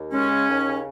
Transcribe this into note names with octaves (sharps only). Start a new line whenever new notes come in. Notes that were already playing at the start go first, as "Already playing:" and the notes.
Already playing: D#2
G#3 C#4
C#3
D#2
C#3